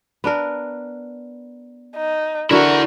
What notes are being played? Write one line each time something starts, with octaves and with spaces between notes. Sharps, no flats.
B3 D4 A#4
D#4
D3 E4 F#4 A#4 E5 F#5